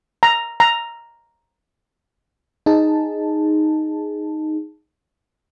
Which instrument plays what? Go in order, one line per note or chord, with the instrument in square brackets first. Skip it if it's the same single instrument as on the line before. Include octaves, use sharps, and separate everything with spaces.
[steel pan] A#5
A#5
[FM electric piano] D#4 G#4 A5